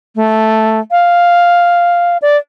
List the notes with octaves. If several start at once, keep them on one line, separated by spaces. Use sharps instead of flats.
A3
F5
D5